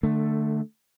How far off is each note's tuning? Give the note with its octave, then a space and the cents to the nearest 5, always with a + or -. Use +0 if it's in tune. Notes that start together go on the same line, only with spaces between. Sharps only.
D3 +25 A3 +0